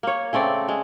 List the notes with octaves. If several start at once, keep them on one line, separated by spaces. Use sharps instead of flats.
A#3 C#5
C#3 A3 C4 D5
G#3